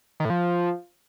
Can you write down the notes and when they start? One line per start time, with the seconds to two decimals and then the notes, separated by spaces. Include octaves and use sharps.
0.20 D#3
0.25 A2
0.30 F3